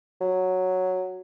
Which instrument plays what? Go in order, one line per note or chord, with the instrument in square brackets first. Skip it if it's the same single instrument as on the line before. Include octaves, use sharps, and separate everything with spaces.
[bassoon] F#3